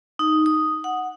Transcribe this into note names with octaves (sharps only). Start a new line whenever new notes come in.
D#4
D#6
F#5